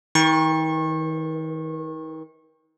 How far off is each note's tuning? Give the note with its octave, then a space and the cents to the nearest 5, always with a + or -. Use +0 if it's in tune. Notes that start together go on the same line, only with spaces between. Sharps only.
D#3 +40 C#6 -30